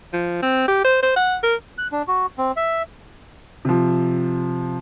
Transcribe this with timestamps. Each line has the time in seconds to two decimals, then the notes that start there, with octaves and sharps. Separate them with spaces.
0.13 F3
0.42 C4
0.68 G4
0.84 C5
1.02 C5
1.16 F#5
1.43 A#4
1.78 F#6
1.92 D4
2.08 F#4
2.38 C4
2.57 E5
3.65 C3 F3